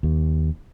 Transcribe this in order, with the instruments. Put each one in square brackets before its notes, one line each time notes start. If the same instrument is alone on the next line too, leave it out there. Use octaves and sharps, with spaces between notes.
[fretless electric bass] D#2